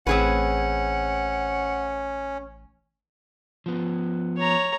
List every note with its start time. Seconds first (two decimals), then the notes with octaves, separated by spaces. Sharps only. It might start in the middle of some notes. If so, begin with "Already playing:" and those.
0.07 A1 C4 C#4 G#4 B4 F#5
3.66 F3 B3
4.37 C#5 A#5